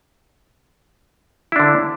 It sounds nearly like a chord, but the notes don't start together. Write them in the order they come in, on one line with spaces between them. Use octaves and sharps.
E4 D4 D3